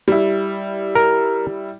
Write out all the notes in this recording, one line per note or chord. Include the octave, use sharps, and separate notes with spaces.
G3 E4
A#4